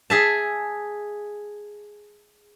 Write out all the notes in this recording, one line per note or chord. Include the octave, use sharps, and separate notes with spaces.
G#4 E5 A5